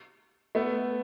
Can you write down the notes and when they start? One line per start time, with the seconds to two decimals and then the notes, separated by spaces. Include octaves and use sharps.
0.55 A3 B3